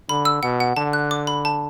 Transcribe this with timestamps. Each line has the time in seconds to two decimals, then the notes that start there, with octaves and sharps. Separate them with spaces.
0.09 D3 B5
0.25 E6
0.43 B2 F#5
0.60 F#5
0.77 D3 A5
0.93 F#6
1.11 D6
1.27 B5
1.45 A5